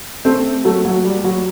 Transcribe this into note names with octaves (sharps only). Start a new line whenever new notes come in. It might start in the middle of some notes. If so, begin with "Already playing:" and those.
A3 C4
F#3 A3
F#3
G3
F#3